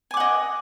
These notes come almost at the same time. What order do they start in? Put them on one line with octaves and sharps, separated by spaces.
G#5 D6 F#5 D#5